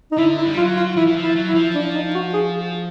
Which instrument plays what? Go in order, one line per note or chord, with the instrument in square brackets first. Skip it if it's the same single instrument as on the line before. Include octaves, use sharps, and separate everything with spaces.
[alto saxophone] D#4
[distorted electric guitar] D3 [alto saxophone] E4
[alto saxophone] E4
[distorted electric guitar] G3
[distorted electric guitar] F#3 [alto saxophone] F4
[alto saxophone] F4
[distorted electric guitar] E3 [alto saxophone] E4
[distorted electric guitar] E3
F3
[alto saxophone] E4
[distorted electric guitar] F#3
[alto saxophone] E4
[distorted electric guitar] F3
[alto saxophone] D4
D#4
F#4
G#4